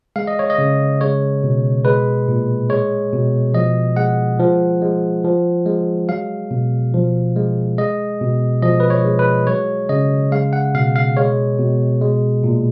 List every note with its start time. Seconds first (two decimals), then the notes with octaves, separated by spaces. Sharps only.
0.16 G#3 F5
0.27 D#5
0.39 C#5
0.50 D#5
0.58 C#3
1.01 G#3 C#5
1.43 B2
1.85 G#3 B4
2.28 A#2
2.70 G#3 C#5
3.13 B2
3.54 F3 D#5
3.96 G#3 F#5
4.39 F3
4.82 G#3
5.24 F3
5.66 G#3
6.09 F#3 F5
6.51 B2
6.94 F3
7.36 G#3
7.78 G#3 D#5
8.21 B2
8.62 F3 D#5
8.80 B4
8.90 C#5
9.05 G#3
9.19 B4
9.47 F#3 C#5
9.89 C#3 D#5
10.32 G#3 F5
10.53 F#5
10.74 B2 F5
10.96 F5
11.17 G#3 C#5
11.59 B2
12.01 G#3
12.44 A#2